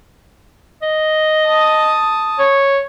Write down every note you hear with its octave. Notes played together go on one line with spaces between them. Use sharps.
D#5
A5 D#6
C#5